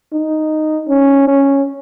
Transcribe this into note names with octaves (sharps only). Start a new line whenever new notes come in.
D#4
C#4
C#4